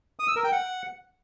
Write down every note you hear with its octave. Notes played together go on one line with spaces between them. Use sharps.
D#6
E6
A#4
G5
F#5